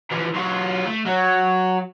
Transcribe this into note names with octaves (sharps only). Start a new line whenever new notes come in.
E3 F3
F#3 F4
A3
F#3